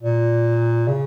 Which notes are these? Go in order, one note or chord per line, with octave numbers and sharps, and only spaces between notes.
A#2
C#3